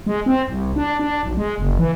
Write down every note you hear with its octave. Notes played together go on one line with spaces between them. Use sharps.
G#3
C4
C2
D4
D4
B1
G#3
F#1
E3